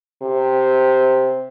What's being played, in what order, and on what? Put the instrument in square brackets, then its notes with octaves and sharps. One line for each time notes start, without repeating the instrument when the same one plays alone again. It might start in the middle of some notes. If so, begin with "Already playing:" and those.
[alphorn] C3